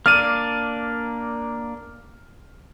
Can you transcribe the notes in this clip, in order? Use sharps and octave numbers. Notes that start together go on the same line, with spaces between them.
A#3 D4 D5 F6 D#7